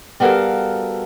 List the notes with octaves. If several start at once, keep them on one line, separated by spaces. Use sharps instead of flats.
G3 B3 F#4 A4 A#4 F5